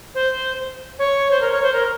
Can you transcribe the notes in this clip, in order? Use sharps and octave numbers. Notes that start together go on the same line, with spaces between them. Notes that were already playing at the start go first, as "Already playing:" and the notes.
C5
C#5
C5
A#4
C#5
C5
A#4